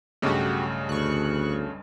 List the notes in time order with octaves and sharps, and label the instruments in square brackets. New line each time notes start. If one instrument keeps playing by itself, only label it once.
[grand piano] B1 G2 [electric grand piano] C#3 A3 [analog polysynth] F#4 G4
[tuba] D2 [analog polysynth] C#6 F#6